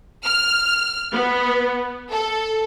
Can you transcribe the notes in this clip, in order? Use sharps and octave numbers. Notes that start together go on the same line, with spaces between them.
F6
B3
A4